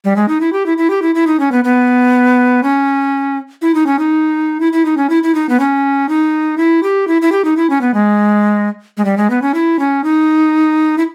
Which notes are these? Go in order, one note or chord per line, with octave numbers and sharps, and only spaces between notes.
G3
G#3
D#4
E4
G4
E4
E4
G4
E4
E4
D#4
C#4
B3
B3
C#4
E4
D#4
C#4
D#4
E4
E4
D#4
C#4
E4
E4
D#4
B3
C#4
D#4
E4
G4
E4
E4
G4
D#4
E4
C#4
B3
G#3
G#3
G3
G#3
B3
C#4
E4
C#4
D#4
E4